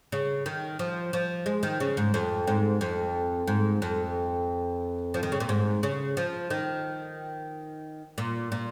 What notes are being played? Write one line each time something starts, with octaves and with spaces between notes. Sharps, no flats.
C#3
D#3
F3
F3
G#3
D#3
C#3
G#2
F2
G#2
F2
G#2
F2
F3
D#3
C#3
A#2
G#2
C#3
F3
D#3
A#2
A#2